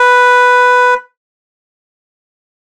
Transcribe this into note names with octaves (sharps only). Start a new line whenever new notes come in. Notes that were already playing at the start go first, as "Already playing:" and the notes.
Already playing: B4